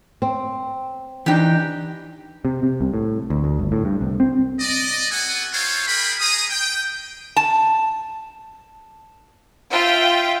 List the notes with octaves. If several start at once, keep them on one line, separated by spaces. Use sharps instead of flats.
C4
E3 D4 D#4 G4 G5
C3
C3
C2
A2
D2
D2
G1
A2
G2
C2
C4
D5 D#5
B3 F#4 A4 F#5 G#5
E4 F4 A4 C5 C#5 F5
F#4 G#4 A#4 G5 B5
G#3 G#4 A#5 D#6
G5
A5
F4 E5 G5